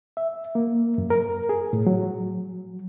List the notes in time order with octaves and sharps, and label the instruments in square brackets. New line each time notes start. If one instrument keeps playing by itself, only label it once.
[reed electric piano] E5
A#3
F#2
A#4
G#4
A2
F#3